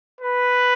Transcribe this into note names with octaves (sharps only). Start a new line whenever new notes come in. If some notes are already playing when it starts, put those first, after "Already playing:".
B4